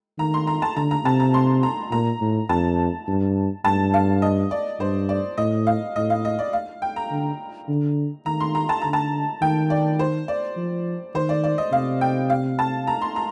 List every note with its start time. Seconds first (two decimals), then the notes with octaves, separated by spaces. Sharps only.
0.18 D#3 A#5
0.34 C6
0.47 A#5
0.62 A5
0.76 D3 A#5
0.91 A#5
1.05 C3 A5
1.20 A#5
1.34 C6
1.63 A#5
1.91 A#2 A#5
2.21 A2
2.49 F2 A5
3.08 G2
3.65 G2 A5
3.94 F5
4.22 D#5
4.51 D5
4.80 G2 C5
5.09 D5
5.38 A2 D#5
5.67 F5
5.96 A2 D#5
6.10 F5
6.25 D#5
6.39 D5
6.53 F5
6.82 G5
6.96 A#5
7.11 D3
7.68 D3
8.26 D#3 A#5
8.40 C6
8.55 A#5
8.69 A5
8.81 D3 A#5
8.93 A5
9.41 D#3 G5
9.70 D5
9.99 C5
10.28 D5
10.56 F3
11.15 D#3 C5
11.29 D5
11.44 D5
11.58 D#5
11.72 C3 F5
12.01 G5
12.30 F5
12.59 A5
12.87 A#5
13.02 C6
13.16 A#5